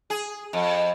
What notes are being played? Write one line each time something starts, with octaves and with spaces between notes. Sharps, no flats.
G#4
F2